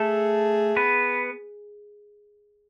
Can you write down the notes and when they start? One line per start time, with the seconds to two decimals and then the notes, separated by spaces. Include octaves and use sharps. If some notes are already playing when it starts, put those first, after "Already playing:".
Already playing: A3 G#4 A4
0.76 B3 B4